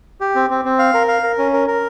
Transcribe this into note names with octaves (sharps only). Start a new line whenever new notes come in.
G4
C4
C4
C4
F5
A#4
F5
A#4
C#4
A#4
A#4